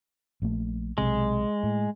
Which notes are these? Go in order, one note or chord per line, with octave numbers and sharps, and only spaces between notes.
A#1 A#2 A3
B1 C3 G#3
A2